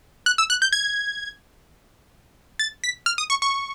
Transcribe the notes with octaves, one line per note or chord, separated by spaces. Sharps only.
F#6
E6
F#6
G6
G#6
A6
B6
F6
D#6
C#6
C#6